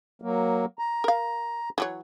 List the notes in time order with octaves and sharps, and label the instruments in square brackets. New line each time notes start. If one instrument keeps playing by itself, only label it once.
[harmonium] F#3 A#3
A#5
[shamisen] A#4 F5
E3 F#3 C#5